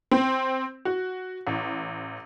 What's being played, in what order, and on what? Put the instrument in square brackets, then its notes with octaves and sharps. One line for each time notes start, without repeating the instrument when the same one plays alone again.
[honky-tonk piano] C4
F#4
A1